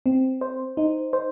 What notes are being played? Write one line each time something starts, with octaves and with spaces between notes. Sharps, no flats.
C4
C5
D#4
C5